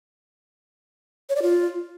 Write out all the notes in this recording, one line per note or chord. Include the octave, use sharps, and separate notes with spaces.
C#5
D5
F4